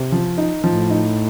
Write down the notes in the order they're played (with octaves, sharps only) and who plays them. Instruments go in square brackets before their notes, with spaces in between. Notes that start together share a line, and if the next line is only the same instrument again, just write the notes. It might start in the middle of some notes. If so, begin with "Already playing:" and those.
Already playing: [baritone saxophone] C3
[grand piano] F3
D#4
[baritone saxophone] A2 [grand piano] F3
[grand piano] D#4